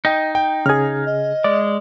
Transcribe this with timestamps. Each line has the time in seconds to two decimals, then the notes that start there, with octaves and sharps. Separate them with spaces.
0.05 D#4 D#5 G5
0.35 G5
0.66 C#3 G#4 F6 G#6
1.05 D#5
1.44 G#3 D5